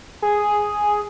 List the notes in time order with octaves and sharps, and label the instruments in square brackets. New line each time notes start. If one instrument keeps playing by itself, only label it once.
[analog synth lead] G#4